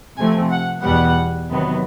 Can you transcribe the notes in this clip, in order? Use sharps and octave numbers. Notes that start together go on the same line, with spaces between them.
C3 F3 A3 C4 G#5
F#5
E2 B2 G3 B3 F#5
C3 D#3 F#3 B3